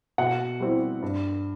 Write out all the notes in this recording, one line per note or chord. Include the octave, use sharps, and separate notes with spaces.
B2 F#5
G3 C4 E4
G2